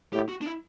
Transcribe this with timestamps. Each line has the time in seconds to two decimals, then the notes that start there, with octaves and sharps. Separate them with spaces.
0.13 A2 G4
0.29 F#4
0.41 D4
0.46 E4